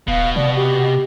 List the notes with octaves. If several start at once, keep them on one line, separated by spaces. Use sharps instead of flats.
D#1 B2 F5
C3 D5
G4